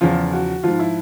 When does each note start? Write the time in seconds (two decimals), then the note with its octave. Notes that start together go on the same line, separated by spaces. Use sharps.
0.01 E2 C#3 F3 F4
0.32 F#4
0.63 G#2 F3 F4
0.79 E4